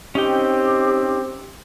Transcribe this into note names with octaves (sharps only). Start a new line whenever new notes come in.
C4 C#4 D#4 G4 G5